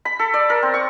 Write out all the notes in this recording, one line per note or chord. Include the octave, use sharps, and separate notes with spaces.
B5
A4
D5
A#4
C4
C#6